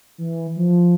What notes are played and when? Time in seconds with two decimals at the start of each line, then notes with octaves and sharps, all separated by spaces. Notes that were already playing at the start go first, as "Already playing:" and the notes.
0.18 E3
0.56 F3